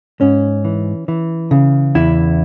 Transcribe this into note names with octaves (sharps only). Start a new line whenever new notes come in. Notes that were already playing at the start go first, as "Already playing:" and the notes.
G#2 C#4
E3
E3
C#3
E2 E4